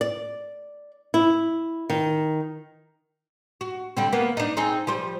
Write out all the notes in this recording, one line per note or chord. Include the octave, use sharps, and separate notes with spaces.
D5
E4
D#3
F#4
D3 G3 C4
A#3 B3
D4 D#4
C4 D#4 G#4
F3 G3 C5